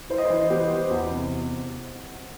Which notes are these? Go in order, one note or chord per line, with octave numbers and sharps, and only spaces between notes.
E4 C5
D#5
E3 C5
B3 G4
B3
E2 F#4
C3